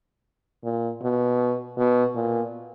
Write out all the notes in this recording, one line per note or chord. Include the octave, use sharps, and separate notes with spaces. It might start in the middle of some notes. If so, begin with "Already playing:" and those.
A#2
B2
B2
A#2